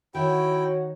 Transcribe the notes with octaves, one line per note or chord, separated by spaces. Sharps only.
D#3 E4 F#4 C#5 G5